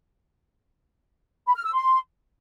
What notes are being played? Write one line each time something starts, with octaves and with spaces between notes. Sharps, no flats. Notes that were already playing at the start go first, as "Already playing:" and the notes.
B5
F6
E6
C6